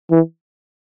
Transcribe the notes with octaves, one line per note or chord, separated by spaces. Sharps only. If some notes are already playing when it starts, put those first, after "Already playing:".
E3